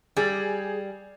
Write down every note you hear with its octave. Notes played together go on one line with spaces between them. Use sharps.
G3 G#4